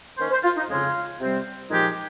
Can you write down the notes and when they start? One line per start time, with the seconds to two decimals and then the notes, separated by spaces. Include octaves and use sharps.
0.18 D#3 A#3 C#4 C5
0.31 C5
0.43 F4
0.57 D#4
0.69 F2 C#3 G#3 C#4 F4
1.20 C3 G3 C4
1.70 A#2 F3 G#3 D#4 G4